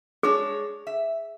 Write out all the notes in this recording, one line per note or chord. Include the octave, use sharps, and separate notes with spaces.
G#3 D4 G#4 C#5
E5